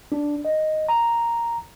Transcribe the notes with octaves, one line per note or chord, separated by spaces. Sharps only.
D4
D#5
A#5